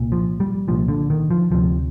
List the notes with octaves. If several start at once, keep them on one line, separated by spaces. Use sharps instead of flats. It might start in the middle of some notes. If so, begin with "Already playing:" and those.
Already playing: C2 A#2
F3
G3
C2 A#2 F3
D3
D#3
F3
D2 C3 F3